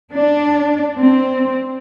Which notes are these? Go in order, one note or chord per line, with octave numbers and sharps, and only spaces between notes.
D4
C4